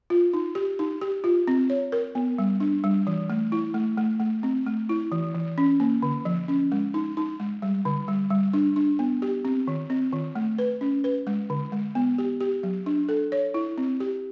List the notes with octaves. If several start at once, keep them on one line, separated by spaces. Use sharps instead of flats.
F4
D#4
G4
D#4
G4
F4
C4
C#5
A#4
B3
G3
D4
G3
E3
A3
E4
A3
A3
A3
C4
A3
E4
E3
E3
C#4
A#3
D3
F3
C#4
G#3
D#4
D#4
G#3
G3
D3
G3
G3
D4
D4
B3
G4
C4
D#3
C4
D#3
A3
B4
C#4
B4
G#3
D3
G#3
B3
G4
G4
F#3
D4
A4
C#5
E4
C4
G4